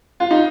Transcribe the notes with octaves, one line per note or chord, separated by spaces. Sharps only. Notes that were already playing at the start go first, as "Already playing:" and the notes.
F4
D#4